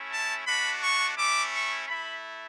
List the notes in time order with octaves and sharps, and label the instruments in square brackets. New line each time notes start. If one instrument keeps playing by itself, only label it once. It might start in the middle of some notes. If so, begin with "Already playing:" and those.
Already playing: [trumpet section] A3 C#4 E4
A5
A3 D4 F#4 B5
C#6
A3 C#4 E4 D6
C#6
A3 E4 B5